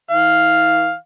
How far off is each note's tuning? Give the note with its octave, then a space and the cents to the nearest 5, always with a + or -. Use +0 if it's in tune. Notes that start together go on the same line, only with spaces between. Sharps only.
E3 -45 F5 +0